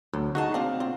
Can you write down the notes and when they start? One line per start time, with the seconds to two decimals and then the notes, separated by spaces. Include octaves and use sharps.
0.14 D2 F#3
0.35 D#4 F#4 G#4 A5
0.54 C4 D4 F5
0.80 C4 F4